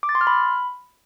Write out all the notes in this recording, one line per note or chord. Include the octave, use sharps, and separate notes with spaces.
D6
A6
C6
F6
B5